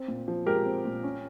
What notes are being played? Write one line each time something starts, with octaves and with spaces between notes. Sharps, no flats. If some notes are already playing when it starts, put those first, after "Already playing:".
Already playing: C4
A#2
F3
G#3 G4 A#4
C4
A#2
C#4